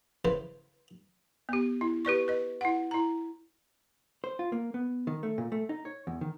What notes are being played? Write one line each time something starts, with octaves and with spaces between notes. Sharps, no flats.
C#3 E3 B4 C5
B3 G4
E4
G4 B4 D5 C#6
B4 D#5
E4 F#5
E4 A#5
C5
F4
A#3
B3
D#3
A3
A#2
A3
D#4
C#5
E2
D#3